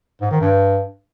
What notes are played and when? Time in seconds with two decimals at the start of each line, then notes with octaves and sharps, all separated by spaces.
0.21 G#2
0.31 D#3
0.40 G2